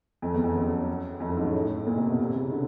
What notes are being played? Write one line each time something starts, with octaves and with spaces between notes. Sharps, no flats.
F2
E2
F2
F#2
F2
F#2
G#2
A2
A#2
C3
B2
C3
C#3
D3